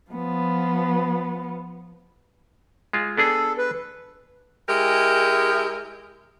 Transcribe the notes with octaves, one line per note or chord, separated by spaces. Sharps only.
F3 B3
G#3 F4
B3 D4 G#4 A4
B4
G#3 E4 G4 A#4